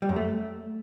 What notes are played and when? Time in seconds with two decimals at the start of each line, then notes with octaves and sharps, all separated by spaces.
0.02 G3
0.09 F#2
0.16 A3